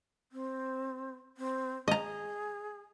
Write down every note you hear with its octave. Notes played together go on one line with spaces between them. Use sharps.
C4
C4
G#4 D#5 A#5